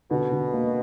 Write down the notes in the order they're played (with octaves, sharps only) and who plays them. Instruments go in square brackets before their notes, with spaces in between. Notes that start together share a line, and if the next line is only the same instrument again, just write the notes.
[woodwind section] B2 [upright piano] D3
[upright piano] D3
A#3